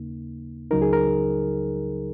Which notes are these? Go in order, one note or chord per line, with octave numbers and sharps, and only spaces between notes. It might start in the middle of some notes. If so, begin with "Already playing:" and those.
Already playing: D#2 C#3 A#3 D#4
C#2 C#3 F#3 D#4 A#4
G#4
A#4